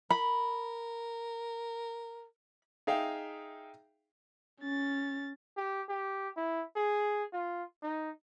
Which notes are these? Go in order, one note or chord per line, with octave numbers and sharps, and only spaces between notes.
A#4 B5
D#4 G#4 E5 F5 G5
C#4 A6
G4
G4
E4
G#4
F4
D#4